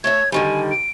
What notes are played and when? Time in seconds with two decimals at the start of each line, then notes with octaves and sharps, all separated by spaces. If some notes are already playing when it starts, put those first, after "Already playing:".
0.04 A3 C#5 E5 G#6
0.32 D3 D#3 G3 G#5
0.71 D7